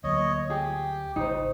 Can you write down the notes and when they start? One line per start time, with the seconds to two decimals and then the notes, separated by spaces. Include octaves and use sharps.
0.04 D2 F#3 A#3 C#5 D#5
0.50 G4 G#4
1.16 G#1 C#3 D#4 C5